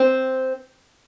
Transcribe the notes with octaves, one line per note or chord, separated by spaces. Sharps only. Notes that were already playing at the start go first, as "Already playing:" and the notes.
Already playing: C4